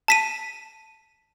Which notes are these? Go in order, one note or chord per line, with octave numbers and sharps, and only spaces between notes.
A5 B6 D#7